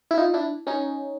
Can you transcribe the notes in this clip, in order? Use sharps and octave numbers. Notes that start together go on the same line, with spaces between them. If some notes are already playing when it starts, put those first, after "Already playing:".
E4
D#4 F4
D4 E4
C#4 D#4